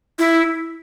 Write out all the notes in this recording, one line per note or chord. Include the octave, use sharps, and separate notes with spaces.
E4